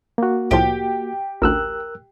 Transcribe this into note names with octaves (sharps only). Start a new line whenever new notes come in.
A#3 F#4
C2 A2 F3 G4
A1 D2 A#4 E6 F#6